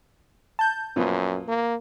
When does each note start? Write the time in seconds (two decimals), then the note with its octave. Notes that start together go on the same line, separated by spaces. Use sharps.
0.59 A5 G6
0.96 F#2 A#2 F3 B3
1.48 A#3